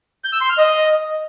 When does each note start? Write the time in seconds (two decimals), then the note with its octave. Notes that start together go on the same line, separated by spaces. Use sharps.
0.24 G6
0.33 E6
0.41 C6
0.50 F6
0.58 D#5